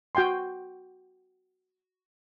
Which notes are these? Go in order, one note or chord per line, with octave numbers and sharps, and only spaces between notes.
F#4 G5 G#5 C6